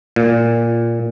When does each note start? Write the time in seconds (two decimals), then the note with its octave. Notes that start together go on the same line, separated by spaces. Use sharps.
0.16 A#2